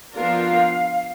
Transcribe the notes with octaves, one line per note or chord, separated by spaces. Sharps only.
F3 B3 D4 F4 A#4 F5